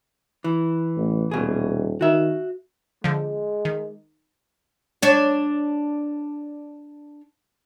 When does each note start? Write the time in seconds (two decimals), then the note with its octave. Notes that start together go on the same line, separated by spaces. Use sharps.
0.44 E3
0.97 A1
1.31 D#1 B2 G#4
2.01 D#3 F#4 E5
3.04 D3 F3 G#3
3.65 D#3
5.02 D4 C#5